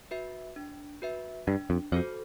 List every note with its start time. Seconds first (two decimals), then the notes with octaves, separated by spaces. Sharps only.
0.11 F#4 B4 E5
0.56 D4
1.02 F#4 B4 E5
1.47 G2 D4
1.70 F2
1.92 F2 F#4 A4 C5